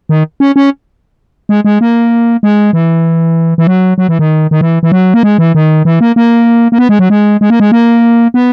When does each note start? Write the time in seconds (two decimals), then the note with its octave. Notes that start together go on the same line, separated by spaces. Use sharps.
0.09 D#3
0.40 C#4
0.56 C#4
1.49 G#3
1.65 G#3
1.81 A#3
2.43 G#3
2.73 E3
3.58 E3
3.67 F#3
3.98 F#3
4.09 E3
4.19 D#3
4.51 D#3
4.61 E3
4.83 E3
4.92 F#3
5.14 A#3
5.23 G#3
5.38 E3
5.55 D#3
5.85 E3
6.01 A#3
6.16 A#3
6.72 A#3
6.78 B3
6.89 G#3
6.99 F#3
7.10 G#3
7.41 G#3
7.50 A#3
7.60 G#3
7.72 A#3
8.34 B3